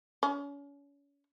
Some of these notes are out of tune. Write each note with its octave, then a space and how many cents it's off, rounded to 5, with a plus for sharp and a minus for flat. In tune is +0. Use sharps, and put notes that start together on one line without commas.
C#4 +35